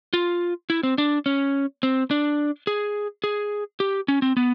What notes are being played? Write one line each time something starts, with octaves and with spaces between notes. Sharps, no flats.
F4
E4
C4
D4
C#4
C4
D4
G#4
G#4
G4
C#4
C4
B3